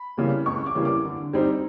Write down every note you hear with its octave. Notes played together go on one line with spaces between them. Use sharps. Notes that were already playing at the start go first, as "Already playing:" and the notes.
Already playing: B5
C#3 E3 G3 A#3
C#2 C#6
D6
C#3 E3 G3 A#3
D6
D3
G3 C4 D#4